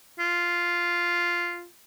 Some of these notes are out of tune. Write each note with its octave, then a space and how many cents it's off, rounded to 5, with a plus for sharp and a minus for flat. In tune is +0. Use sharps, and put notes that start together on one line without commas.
F4 -5